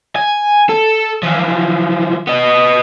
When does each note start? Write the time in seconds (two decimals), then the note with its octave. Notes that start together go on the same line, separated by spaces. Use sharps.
0.16 G#5
0.69 A4
1.23 E3 F3
2.27 B3 D#5